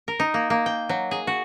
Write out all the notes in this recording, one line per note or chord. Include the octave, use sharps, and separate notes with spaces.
A#4
D#4
A#3
A#3
G5
F#3
G#4
F#4